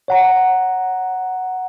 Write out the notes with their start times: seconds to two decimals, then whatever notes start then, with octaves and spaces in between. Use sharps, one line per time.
0.08 C#5 F#5 A#5